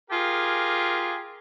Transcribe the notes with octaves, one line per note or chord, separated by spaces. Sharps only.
F4 G4 G#4 A#4